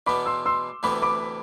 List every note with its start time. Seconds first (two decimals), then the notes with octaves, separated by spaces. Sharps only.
0.07 E2 B2 B3 B5 D6
0.26 C6 E6
0.45 C6 E6
0.83 D2 C3 E3 B3 B5 D6
1.02 B5 D6